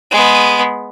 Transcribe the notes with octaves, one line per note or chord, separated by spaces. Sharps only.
G#3 B3